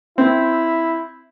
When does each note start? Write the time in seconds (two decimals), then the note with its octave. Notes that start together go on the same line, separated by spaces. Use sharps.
0.18 C4 E4